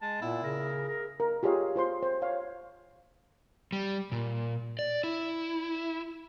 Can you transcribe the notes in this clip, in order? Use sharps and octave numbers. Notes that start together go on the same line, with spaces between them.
G#3 A5
A#2 B3 E4
C#3 G#4 A#4
A#4
A#4
F4 G4 G#4 C#5 F5
F4 C5 C6
C5
C#5 F5
G3
A#2
D5
E4